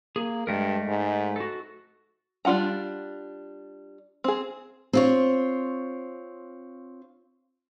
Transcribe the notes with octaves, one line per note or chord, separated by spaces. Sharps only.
A#3 G#4
G2 G#3 A3 A#4
G#2
F#4 A4
G3 D4 F4 F#5 A#5
C4 G#4
C4 F4 C#5